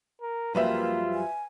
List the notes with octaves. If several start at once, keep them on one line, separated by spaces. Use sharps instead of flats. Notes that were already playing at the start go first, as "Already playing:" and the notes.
A#4
F#2 F3 G3 A#3 F4 B4 E5
G#5